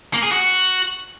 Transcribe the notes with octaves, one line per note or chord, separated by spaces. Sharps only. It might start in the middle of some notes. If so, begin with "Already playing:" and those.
A#3
G#4
F#4